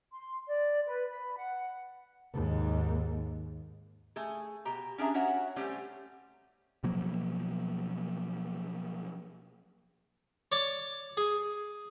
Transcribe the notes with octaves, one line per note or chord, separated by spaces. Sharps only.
C6
D5
B4
B5
F#5
D#2 G#2
A3 G#4
B2 G4 A#5
C#4 D4 G#4 E5 A#5
C#4 F#4 C#5 E5 F#5
G3 A3 C4 C#4 G4
B2 F3 F#3 A#3
C#5 D5
G#4